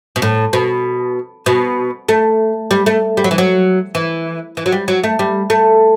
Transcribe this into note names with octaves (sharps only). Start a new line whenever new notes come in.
B2
A2
B2
B2
A3
G3
A3
G3
F#3
E3
F#3
E3
E3
F#3
G3
F#3
A3
G3
A3